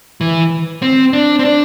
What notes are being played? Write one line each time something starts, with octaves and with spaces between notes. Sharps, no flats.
E3
C4
D4
C4
D4